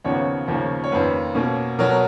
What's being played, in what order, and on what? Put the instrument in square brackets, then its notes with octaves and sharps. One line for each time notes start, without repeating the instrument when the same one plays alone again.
[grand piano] D#2 C#3 F3 B3 C#5
D#2 C#3 F3 A#3 C#4
C#5
F2 D#3 A#3 C#4 B4
B2 A#3 C#4
B2 F#3 B3 A#4